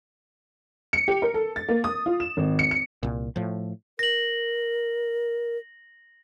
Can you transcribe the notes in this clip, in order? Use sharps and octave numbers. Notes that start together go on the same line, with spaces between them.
C#7
G4
A#4
A4
A6
A#3
D#6
F4
E7
G#1
C#7
C#7
C2 A#2
A2 F3
A#4 A#6 F#7